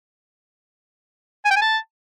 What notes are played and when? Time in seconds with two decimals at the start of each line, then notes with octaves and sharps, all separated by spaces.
1.45 G#5
1.51 G5
1.56 G#5
1.62 A5